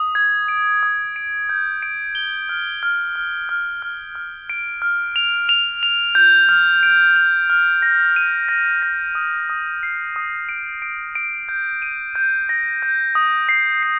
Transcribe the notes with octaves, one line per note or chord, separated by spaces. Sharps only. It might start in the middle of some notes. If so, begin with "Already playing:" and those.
Already playing: D#6
G#6
D7
D#6
D7
G6
D7
G7
F6
F6
F6
F6
F6
F6
D7
F6
F7
F7
F7
G6
F6
D7
F7
F6
A#6
D#7
A#6
A#6
D#6
D#6
C7
D#6
D7
D7
D7
G6
D#7
G6
A#6
G6
D#6
C7
C7